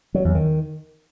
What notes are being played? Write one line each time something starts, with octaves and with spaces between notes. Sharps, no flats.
F#3
E2
D#3